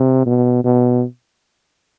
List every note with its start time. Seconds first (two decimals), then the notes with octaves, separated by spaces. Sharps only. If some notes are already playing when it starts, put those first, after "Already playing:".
Already playing: C3
0.26 B2
0.64 B2